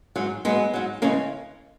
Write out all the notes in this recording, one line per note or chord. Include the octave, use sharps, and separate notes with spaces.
G#2 F#3
G#2 F#3 G#3 B3
G#2 F#3
C#3 E3 G#3 A#3 C#4